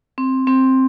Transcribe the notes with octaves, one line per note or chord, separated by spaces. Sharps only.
C4
C4